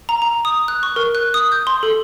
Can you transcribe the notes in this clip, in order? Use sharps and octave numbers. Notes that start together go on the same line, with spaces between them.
A#5
A#5
D#6
F#6
C#6
A#4
F#6
D#6
G6
C6
A4